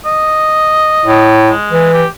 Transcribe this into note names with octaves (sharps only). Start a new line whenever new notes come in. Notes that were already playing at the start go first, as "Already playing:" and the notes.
D#5
A2
G#3
E3
G4